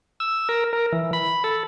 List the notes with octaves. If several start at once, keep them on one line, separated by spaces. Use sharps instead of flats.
E6
A#4
A#4
E3
B5
A4